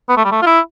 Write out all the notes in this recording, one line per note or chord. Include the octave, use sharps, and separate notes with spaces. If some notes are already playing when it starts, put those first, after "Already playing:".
B3
A3
G3
A3
F4
E4